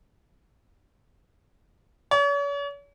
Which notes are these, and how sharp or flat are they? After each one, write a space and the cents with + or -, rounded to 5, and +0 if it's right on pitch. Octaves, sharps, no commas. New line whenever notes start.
C#5 +40